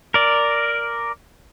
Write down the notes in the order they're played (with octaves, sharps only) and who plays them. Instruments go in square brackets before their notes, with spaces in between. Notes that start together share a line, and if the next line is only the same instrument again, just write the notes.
[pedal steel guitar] A#4 D5